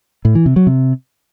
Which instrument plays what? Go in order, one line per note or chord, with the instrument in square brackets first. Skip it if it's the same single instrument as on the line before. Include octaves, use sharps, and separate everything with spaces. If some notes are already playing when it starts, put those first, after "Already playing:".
[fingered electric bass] A2
E3
C3
F#3
C3